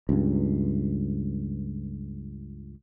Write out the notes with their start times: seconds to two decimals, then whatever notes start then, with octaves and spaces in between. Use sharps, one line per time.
0.09 C#2 G2